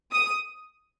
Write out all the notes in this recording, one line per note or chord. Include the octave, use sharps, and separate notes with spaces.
D#6